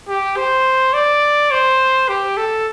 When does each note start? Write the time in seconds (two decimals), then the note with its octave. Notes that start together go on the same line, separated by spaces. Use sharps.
0.08 G4
0.37 C5
0.94 D5
1.51 C5
2.09 G4
2.37 A4